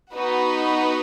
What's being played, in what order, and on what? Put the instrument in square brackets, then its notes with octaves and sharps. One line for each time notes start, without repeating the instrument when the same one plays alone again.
[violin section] B3 D#4 F#4 B4